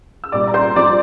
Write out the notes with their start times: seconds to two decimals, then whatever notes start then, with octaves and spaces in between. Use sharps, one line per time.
0.24 E6
0.32 C2 A#2 G3 D5 D6
0.47 A#5
0.54 C5 C6
0.76 G2 F3 C4 D5 D6